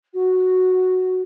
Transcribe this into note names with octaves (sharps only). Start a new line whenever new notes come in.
F#4